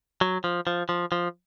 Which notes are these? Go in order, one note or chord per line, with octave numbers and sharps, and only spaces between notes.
F#3
F3
F3
F3
F3